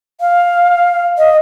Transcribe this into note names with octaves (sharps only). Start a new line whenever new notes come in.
F5
D#5